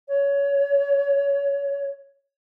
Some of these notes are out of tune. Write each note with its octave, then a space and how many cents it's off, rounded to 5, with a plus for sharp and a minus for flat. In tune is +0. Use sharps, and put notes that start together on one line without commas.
C#5 +20